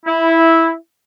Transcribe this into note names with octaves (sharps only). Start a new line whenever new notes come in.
E4